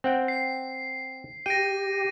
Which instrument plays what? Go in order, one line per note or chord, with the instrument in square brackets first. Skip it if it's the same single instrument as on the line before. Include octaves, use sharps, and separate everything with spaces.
[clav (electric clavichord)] C4 F#5 G5
[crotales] C7
[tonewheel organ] G4 [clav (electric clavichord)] G5 [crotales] A#6 D7 D#7